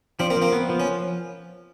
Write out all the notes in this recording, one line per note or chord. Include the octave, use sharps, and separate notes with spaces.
F3 C4 D4
A#3 C4
F3
A#3 C4
B3
F3
C#4